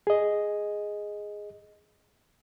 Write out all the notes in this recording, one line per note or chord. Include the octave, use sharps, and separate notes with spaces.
G#4 D#5